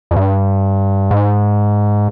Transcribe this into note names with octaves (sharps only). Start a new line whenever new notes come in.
F2
G2
G#2